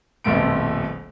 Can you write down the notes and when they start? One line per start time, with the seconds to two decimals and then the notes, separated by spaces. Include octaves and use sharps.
0.24 D#1 A#1 F2 B2 A3 D7